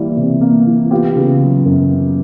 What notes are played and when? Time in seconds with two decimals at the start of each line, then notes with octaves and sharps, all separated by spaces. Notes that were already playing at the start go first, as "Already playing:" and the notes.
Already playing: E3 G3 A#3
0.17 C3
0.41 A#3
0.67 E3
0.90 B3 F4 G4
1.16 C#3
1.41 F#3
1.66 F#2
1.90 B3